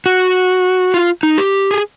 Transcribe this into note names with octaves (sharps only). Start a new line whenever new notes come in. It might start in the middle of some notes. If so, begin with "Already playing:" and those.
F#4
F4
D#4
G4
G#4